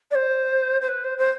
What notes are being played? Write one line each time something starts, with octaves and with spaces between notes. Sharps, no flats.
D5
C5
C5
B4
C5
C5